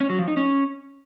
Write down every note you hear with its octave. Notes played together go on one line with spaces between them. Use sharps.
C#4
F#3
F3
D#4
C#4